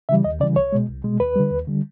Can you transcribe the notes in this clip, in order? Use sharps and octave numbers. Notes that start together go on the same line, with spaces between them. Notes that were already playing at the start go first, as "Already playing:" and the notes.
C#3 E3 G3 E5
D#2 D#5
C#3 E3 G3 D5
C2 C#5
B2 G#3
C2
B2 G#3
D#2 B4
D3 G3
D#2
D3 G3